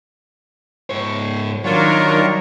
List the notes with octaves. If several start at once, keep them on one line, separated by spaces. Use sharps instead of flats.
G#2 C#5
D#3 F#3 D4 F4 A#4 C#5